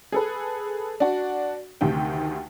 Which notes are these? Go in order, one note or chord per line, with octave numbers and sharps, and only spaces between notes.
G#4 A4 B4
D4 F#4
D2 C3 D#3 G5